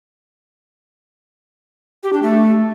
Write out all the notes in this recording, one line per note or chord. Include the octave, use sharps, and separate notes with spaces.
G4
D4
A3